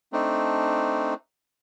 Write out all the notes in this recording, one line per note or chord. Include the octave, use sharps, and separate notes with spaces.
A3 C4 D4 D#4